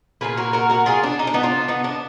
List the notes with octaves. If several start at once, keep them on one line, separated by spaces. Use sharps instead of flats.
A#2 F3 A#3 G#4 B4
F#4 A#4
F#4 A#4
F#4 A#4
F4 G#4
D4
D#4
D4
B3 D#4
D4 F4
B3 D#4
D4